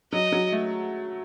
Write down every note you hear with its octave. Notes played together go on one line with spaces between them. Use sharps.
F#3 D#5
F#3
A3